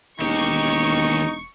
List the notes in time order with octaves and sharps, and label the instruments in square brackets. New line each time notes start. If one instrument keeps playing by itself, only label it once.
[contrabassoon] E1 [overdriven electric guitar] D#2 G4 [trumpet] D#4 [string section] C#6